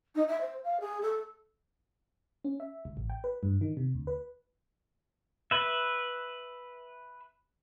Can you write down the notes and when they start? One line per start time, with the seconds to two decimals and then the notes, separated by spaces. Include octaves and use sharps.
0.15 D#4
0.28 E5
0.41 C5
0.64 F5
0.80 G#4
1.02 A4
2.44 C#4
2.60 E5
2.85 C#2
2.97 A1
3.10 G5
3.24 B4
3.43 G2
3.61 D#3
3.77 C3
3.95 D2
4.07 B4
5.51 B4 E5